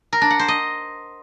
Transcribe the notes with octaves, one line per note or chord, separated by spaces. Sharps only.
A#4
D4
F#5
C5
D#5